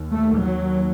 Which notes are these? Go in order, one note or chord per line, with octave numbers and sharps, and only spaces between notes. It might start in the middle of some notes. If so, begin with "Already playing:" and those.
Already playing: D#2
A3
F#3